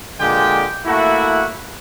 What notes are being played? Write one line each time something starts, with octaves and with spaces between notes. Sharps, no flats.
A#2 D3 G#3 G4 G5
A3 A#3 E4 F#4